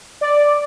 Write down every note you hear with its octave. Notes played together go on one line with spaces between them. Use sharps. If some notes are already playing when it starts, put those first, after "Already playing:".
D5